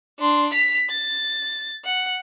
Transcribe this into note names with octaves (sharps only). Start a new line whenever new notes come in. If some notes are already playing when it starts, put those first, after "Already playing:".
D4 C6
B6 F7
A6
F#5